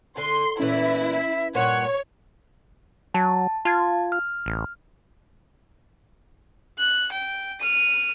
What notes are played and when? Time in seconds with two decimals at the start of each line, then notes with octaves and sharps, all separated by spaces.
0.17 D3 C6
0.60 E2 A#2 E3 C#4 E4 B4 E5
1.10 E5
1.55 G2 A#2 C#5 F#5
3.14 F#3 A5
3.65 F4 A5 G#6
4.12 F6
4.46 A1
6.78 F#6
7.11 G5
7.61 F6 D#7